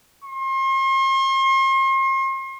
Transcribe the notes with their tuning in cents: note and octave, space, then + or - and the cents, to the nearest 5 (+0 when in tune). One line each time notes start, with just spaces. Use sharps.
C6 +40